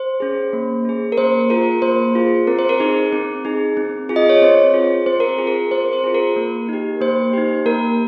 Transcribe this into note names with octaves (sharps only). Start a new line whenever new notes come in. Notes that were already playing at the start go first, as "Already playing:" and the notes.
Already playing: C5
C#4 G#4
A#3
C#4 G#4
A#4
A#3 C5
F4 G#4 A#4
A#3 C5
F4 G#4
C4 A#4
C5
A#4
D#4 G#4
C4
D#4 G#4
C4
F4 G#4
D#5
C#5
C4 C5
F4 G#4
C4 C5
A#4
F4 G#4
A#4
C4 C5
C5
F4 G#4
A#4
A#3
D#4 G4
A#3 C5
D#4 G4
A#3 A#4